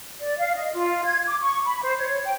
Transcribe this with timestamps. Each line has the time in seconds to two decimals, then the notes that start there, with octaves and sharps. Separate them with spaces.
0.22 D5
0.39 F5
0.56 D#5
0.73 F4
1.05 G#6
1.26 D6
1.40 C#6
1.65 B5
1.82 C5
1.96 C#5
2.24 G5